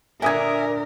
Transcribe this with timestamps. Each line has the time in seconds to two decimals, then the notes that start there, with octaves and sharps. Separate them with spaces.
0.22 A#2 D3 A#4 E5 G#5 D#6 G#6